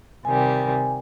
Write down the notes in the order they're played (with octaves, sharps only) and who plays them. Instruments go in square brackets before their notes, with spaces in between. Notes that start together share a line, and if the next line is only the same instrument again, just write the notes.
[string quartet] C3 D#3 G3 [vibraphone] G#5